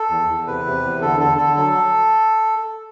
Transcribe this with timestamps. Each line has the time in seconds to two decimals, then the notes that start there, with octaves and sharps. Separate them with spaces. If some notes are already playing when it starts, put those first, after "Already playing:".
Already playing: A4
0.10 E2
0.28 E2
0.47 C3 B4
0.66 C3
0.84 E2
1.01 D3 A4
1.20 D3 A4
1.38 D3 A4
1.56 F#3 A4